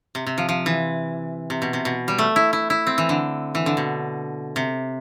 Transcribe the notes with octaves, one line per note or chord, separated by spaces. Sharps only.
C3
C3
F3
F3
E3
C3
B2
C3
B2
G3
A3
E4
E4
E4
C4
E3
D3
E3
D3
B2
C3